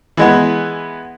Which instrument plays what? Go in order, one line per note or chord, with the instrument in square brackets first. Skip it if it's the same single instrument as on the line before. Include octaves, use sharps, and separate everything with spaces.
[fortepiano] E3 G#3 B3